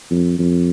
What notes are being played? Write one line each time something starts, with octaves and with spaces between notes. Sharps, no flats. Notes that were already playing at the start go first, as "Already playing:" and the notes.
F2
F2